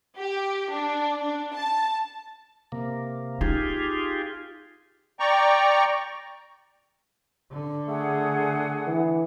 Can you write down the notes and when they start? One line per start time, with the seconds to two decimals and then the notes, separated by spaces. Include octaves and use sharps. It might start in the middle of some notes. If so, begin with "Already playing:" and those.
0.18 G4
0.71 D4
1.23 D4
1.54 A5
2.72 C3 A#3
3.41 D#4 F4 G4 G#4
5.20 D5 G5 A#5 C#6
7.51 D3
7.88 A3 G#4 F#5
8.87 E3